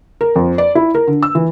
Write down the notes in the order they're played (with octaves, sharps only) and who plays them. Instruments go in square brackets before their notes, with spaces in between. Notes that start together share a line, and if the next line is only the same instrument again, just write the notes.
[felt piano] A#4
F2
D5
E4
A#4
D3
E6
E3